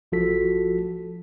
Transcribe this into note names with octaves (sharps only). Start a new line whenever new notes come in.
A1 F3 F4 F#4 A4 B6